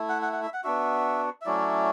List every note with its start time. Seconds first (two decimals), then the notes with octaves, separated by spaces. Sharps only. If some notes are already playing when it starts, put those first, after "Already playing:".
Already playing: A3 E4
0.09 F#5
0.22 F#5
0.33 F#5
0.43 E5
0.54 F#5
0.64 B3 D4 F#4 E5
1.42 E5
1.46 F#3 A3 C#4 E4 D5